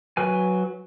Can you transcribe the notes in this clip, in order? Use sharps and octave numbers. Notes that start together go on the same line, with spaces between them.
F#3 B4 G#5